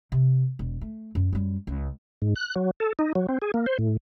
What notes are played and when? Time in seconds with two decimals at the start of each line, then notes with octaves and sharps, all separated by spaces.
0.12 C3
0.59 E1
0.81 A3
1.15 F#2
1.32 F#2 G3
1.67 C#2
2.22 G#2
2.36 F#6
2.56 F#3
2.80 A4
2.99 D#4
3.15 F#3
3.29 C4
3.42 G#4
3.54 A#3
3.66 C5
3.79 A2